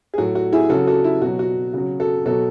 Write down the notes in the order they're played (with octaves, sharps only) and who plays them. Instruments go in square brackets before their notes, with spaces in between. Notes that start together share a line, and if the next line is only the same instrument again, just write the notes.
[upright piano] G#4
A2 F#3 F#4
F#4
E4 G#4
C#3 F#3 F#4 A4
F#4 A4
E4
B2 F#3 F#4
F#4
C#3 F#3 F#4
F#4 A4
B2 F#3 F#4 A4